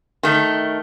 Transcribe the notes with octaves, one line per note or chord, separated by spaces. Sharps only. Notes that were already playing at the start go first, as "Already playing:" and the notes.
D#3 A3